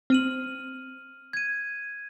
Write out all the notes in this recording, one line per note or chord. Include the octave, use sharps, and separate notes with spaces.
C4 F6 D#7 F#7
G#6 D#7